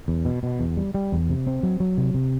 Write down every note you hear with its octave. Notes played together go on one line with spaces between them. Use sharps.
E2
B2
B2
E2
G3
G3
E2
C3
C4
F#3
F#3
C3
C3